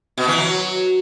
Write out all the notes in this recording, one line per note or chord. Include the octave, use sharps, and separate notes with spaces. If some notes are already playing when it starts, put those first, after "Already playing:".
B2
E3
F#3